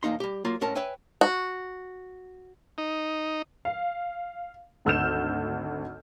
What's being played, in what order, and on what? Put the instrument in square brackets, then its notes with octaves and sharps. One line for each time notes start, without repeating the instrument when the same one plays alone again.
[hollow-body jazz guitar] B1 E2 A#3 D#4 C6
G3 G4
F#3 A#3 F4
A2 G#3 C#4 A#4 A5
B4 C#5 E5 G5 G#5
[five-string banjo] F#4
[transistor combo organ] D#4
[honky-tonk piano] F5
G#1 D2 E6 F6 G6 E7